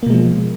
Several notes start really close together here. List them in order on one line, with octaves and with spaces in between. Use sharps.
A#3 B2 G#3 F3